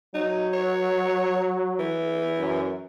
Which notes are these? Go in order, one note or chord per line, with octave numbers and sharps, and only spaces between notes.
F#3 D#4
C#5
E3
F#2